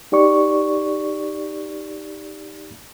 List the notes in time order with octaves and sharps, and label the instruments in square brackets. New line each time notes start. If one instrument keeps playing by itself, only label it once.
[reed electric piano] D#4 G4 D5 C#6